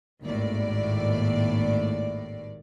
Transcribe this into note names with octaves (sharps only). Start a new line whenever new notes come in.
G#1 D#2 A2 D5